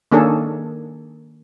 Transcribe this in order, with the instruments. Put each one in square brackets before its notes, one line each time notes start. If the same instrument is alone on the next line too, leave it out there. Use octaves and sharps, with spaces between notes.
[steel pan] D#3 A#3 C#4 D4 G#4 A4